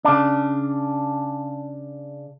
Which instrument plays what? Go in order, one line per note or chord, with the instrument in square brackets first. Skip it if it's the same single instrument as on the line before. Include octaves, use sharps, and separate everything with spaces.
[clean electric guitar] C#3 D4